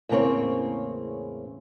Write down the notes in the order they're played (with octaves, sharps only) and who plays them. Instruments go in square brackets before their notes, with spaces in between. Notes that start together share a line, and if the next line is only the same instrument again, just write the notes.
[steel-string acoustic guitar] E2 A2 C#3 A#3 C4 C#5